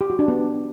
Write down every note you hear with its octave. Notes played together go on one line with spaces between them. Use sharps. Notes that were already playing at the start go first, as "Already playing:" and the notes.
G4
F#4
D4
B3